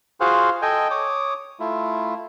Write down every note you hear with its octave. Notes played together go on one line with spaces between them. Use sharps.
F4 F#4 G#4 C5 F5 F#5
A4 D#5 G5 G#5
C#5 D6 D#6
A3 E4 F4